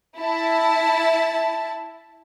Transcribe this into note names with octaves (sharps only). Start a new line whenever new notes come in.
E4 A5